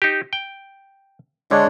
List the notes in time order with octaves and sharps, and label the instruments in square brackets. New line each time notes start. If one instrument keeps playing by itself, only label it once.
[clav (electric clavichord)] D#4 G4
G5
[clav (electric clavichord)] D3 [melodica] G#3 D4 C#5